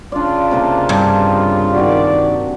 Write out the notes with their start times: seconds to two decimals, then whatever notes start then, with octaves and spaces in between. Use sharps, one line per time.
0.12 C#3 D4 F4 D5
0.51 C3 A#3 A5
0.89 G2
1.75 D#3 F#4 G4 D5